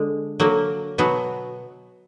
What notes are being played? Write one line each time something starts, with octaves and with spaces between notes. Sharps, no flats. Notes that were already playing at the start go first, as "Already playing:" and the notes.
Already playing: D3 G#3
D3 F#3 A#3
B2 F#3 B3